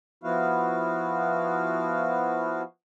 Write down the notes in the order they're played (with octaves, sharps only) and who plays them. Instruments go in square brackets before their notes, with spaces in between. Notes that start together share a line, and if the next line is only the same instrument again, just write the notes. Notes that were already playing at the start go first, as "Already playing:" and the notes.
[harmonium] F3 B3 E4 F#4 F5